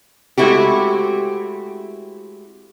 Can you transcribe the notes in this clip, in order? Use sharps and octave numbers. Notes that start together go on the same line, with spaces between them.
G#3 A3 C4 E4 F#4 G4